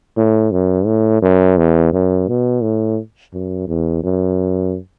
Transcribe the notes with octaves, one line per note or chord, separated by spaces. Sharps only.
A2
F#2
A2
F#2
E2
F#2
B2
A2
F#2
E2
F#2